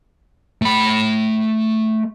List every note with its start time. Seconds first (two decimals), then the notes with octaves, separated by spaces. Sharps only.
0.62 A3 B5